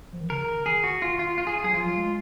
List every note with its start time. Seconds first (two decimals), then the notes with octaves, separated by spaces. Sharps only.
0.13 F3
0.21 D#3
0.30 C#3 A#4
0.66 D#3 G#4
0.84 F#4
1.02 F4
1.19 F4
1.38 F4
1.47 G#4
1.63 F#3 G#4
1.73 F3 F4
1.86 F#3
1.97 G#3